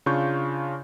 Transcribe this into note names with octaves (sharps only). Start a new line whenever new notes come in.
C#3 D4 F4 C#6 G6